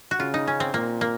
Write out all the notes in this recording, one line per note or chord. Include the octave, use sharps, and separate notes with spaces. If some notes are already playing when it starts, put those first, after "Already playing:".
F#4
C#3 F4
D#4
C#4
C4
A#2 A#3
A#3